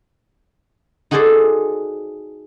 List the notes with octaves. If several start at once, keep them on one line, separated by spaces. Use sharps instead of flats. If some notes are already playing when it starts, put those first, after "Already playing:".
D#4 F#4 G#4 A4 C5 D5